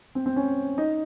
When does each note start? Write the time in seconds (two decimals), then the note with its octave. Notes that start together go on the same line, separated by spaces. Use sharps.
0.15 C4
0.26 C4
0.36 C#4
0.78 D#4